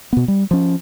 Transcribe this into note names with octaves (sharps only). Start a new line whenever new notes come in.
B2 B3
G3
F3 C#4